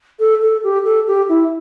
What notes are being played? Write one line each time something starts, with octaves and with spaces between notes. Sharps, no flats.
A4
A4
G4
A4
G4
E4